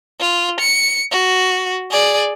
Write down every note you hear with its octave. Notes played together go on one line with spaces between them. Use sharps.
F4
C#7
F#4
G#4 D5